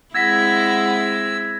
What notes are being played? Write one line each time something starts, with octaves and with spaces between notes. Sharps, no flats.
G#3 C4 E4 F#5 E6 G#6 A#6 B6